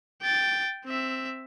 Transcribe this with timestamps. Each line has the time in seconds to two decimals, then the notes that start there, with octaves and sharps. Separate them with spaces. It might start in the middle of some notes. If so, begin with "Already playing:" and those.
0.22 G5 A6
0.85 C4 E5